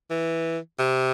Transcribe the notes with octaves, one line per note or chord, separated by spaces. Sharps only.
E3
C3